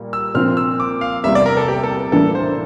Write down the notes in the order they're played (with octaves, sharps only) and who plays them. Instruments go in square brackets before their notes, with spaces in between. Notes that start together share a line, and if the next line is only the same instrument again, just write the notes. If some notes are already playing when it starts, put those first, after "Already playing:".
Already playing: [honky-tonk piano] A#2 G3 A#3
[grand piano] E6
[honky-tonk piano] A#2 F3 C4 [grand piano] F6
[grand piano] E6
D6
F5
[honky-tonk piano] E2 C3 G3 A#3 [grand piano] E5
[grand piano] D5
A#4
A4
G4
A4
[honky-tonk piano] A2 E3 G3 A#3 D4 [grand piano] A4
[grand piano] C5